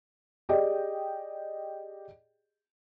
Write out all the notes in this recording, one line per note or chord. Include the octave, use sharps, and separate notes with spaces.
G4 G#4 D5 D#5 G5